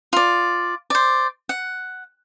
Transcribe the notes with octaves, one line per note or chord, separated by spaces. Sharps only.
F4 D5
C5 D5
F#5